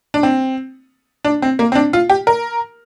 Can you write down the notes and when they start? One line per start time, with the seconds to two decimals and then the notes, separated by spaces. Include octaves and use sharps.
0.14 D4
0.23 C4
1.25 D4
1.42 C4
1.59 A#3
1.72 C4
1.75 D4
1.93 F4
2.10 G4
2.27 A#4